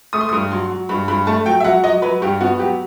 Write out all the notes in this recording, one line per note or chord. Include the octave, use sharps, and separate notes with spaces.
A3 D#6
C6
D#6
G2
F#3 C6
F#3
G2 B5
G2 B5
A3 A5
F#3 G5
E5
F#3 F#5
F#3 D#5
F#3 B4
G2 G4
B3 F#4
F#3 G4